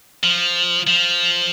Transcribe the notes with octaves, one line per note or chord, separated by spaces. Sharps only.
F3
F3